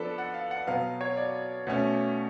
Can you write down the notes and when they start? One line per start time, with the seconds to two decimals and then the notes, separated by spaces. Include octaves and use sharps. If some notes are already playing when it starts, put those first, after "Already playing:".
Already playing: F3 B3 D4 A4 B4
0.18 F#5
0.34 F5
0.51 F#5
0.67 B2 F#3 B3 F5
1.01 C#5
1.17 D5
1.67 B2 A3 C#4